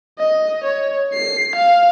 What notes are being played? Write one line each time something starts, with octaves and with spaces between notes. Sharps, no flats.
D#5
C#5
C7
F5